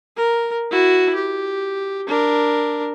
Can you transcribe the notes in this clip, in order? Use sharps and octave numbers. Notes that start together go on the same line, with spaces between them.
A#4
E4 F#4
G4
D4 A#4